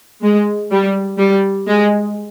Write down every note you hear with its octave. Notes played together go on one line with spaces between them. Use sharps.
G#3
G3
G3
G#3